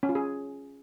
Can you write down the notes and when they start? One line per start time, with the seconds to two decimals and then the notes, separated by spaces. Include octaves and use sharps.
0.03 C#4
0.09 F4
0.15 G#4